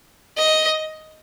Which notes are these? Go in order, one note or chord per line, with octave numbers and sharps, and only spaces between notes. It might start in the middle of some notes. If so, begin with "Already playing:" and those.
D#5